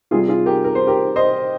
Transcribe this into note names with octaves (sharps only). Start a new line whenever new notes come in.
C3 G3 F4 G#4
F4 G#4
G4 A#4
A#4
C5
G4 A#4
C5 D#5